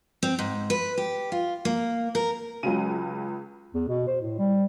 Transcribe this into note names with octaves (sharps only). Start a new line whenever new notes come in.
C4
G#2
B4
G4
F4
A#3
A#4
C#2 C#3 F#3 G#3 D#7
E2
B2
C5
A2
G3